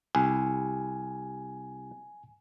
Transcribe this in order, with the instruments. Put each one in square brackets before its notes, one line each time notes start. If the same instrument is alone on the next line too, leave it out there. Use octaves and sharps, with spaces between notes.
[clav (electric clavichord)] C2 [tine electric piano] G#5